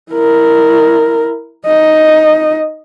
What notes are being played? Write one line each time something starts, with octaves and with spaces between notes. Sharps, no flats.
E4 A#4
D#4 D#5